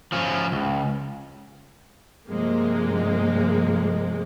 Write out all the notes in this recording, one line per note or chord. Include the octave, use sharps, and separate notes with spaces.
F3 C#4
C#2
G2 C3 F3 G#3 A#3